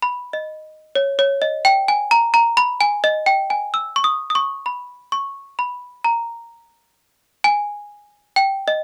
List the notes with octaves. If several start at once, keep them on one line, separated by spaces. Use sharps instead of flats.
B5
D#5
C#5
C#5
D#5
G5
G#5
A#5
A#5
B5
G#5
D#5
G5
G#5
E6
C#6
D#6
D#6
C#6
B5
C#6
B5
A#5
G#5
G5
D#5